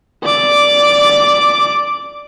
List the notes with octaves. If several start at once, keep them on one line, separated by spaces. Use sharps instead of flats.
D5 D6